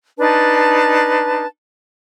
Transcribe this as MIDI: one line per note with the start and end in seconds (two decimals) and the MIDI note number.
0.18 1.45 62
0.18 1.45 63
0.18 1.45 71
0.18 1.45 81